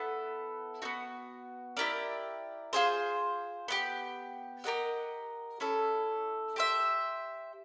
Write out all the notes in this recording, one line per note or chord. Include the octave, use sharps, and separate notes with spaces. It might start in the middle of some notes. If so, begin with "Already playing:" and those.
Already playing: B3 E4 A4
B3 D#4 F#4
E4 G4 A#4 D5
F4 G#4 C5
B3 D4 G4
G4 A#4 D#5 F#5
C#4 E4 A4
G4 C5 E5